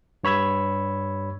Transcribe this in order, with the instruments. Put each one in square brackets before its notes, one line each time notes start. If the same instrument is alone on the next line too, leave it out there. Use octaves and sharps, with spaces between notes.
[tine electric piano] G2 C#5 B5 E6 G#6